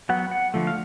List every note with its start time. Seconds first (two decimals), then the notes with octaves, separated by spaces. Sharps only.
0.09 F#3 B3 F#5
0.31 F#5
0.54 D3 F3 A3
0.67 F5